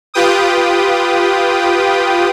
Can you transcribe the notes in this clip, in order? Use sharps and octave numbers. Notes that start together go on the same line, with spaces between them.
F4 G4 B4 G5 D#6